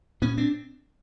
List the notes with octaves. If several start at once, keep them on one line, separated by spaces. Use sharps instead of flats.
A#2 B3 C#4
C4 D4